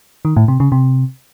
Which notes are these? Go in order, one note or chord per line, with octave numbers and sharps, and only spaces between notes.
D#3
A2
C3
C#3
C3